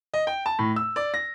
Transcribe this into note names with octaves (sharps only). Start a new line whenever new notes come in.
D#5
G5
A5
A2
E6
D5
A#6